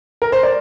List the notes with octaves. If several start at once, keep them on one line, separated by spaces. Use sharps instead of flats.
A#4
C5
D5